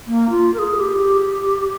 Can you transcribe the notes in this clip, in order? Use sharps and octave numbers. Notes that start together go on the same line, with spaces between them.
A#3
F4
A#4
G#4
G4